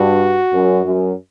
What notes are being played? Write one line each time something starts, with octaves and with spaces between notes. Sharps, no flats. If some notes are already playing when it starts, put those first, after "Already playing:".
Already playing: G2 F#4
F#2
F#2